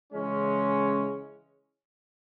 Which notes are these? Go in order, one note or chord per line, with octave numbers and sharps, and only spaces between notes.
C#3 E3 G#3 C#4